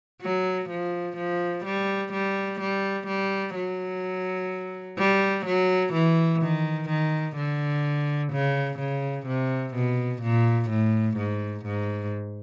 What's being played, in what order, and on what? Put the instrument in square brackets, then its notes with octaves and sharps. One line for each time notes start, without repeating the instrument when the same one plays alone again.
[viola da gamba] F#3
F3
F3
G3
G3
G3
G3
F#3
G3
F#3
E3
D#3
D#3
D3
C#3
C#3
C3
B2
A#2
A2
G#2
G#2